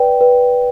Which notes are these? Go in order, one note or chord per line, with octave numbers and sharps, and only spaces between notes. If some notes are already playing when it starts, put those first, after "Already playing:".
Already playing: B4 D5 G5
B4